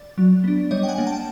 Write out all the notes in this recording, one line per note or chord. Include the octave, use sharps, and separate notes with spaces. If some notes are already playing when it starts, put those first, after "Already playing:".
Already playing: D5
F#3
B3 D4
G3 C#5 D#5
G5
F#5 G#5
A#3 D4
G5 A5